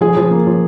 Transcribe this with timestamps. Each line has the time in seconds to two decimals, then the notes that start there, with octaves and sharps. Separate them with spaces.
0.01 F3 G#4
0.17 F3
0.31 A#3
0.47 F3